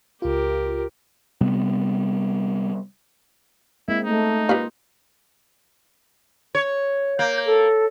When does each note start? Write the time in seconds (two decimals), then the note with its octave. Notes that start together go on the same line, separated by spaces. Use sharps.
0.22 C#2 F4 G4 A#4
1.41 C3 G3 B3
3.88 G#3 A#3 C4 E4
4.05 A3 D#4
4.49 A#3 F4 G4 B4 F5
6.55 C#5
7.19 A#3 G6
7.46 A4